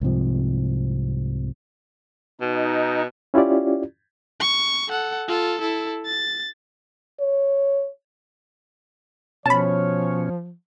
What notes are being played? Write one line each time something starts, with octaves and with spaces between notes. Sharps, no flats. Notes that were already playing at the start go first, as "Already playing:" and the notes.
C2 G#2 C3 F3
B2 D#4
C#4 E4 F4 G4 D5
C#6
A4 F#5
F4 A4
E4 A4
A6
C#5
B2 F3 C#4 C#5 A5 B5